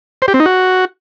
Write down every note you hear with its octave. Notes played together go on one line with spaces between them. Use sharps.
C5
G4
C4
D#4
F#4